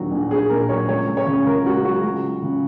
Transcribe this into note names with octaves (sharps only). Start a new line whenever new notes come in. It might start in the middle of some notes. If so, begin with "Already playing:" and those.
Already playing: A#1 D#2 F#3 F#4
A#1
A#1 G#4
A#2 A#4
F#3 C#5
C#2 C#5
C#2
C#5
C#3
C#2 A#4
C#2 F#4
F#3 F#4
C#2
F#3
C#3